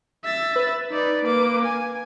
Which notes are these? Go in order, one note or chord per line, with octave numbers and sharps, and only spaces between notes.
E5 A6
B4
D#4 D5
A#3 D6
G#5